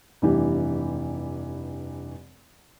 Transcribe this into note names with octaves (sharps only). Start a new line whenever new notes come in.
F1 G2 E3 G4